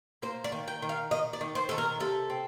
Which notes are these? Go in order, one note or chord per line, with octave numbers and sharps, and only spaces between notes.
A#3 C5
D5
D#3
G5
D#3
F5
D#3 D#5
D5
D#3
C5
D#3 A4
A#4
C3 A4
C4